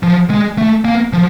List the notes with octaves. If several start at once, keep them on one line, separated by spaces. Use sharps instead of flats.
F3
G#3
A3
A#3
F3